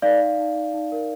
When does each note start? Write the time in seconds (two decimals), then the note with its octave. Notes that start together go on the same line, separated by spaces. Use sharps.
0.02 D#4 D5 F5
0.20 D5
0.38 D#4
0.56 D#4
0.74 D#4
0.92 A#4